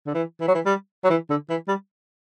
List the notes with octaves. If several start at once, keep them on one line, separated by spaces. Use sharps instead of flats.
D3
E3
E3
F#3
E3
G3
F#3
E3
D3
E3
G3